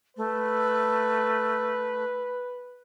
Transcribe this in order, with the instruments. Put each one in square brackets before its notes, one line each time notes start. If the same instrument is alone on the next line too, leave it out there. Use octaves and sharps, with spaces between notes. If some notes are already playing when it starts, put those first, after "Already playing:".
[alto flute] A3 [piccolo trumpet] B4